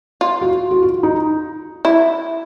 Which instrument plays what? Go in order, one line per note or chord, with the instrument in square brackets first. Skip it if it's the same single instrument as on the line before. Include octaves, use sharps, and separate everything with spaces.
[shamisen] F4
[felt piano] F#4
F#4
F4
D#4
[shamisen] E4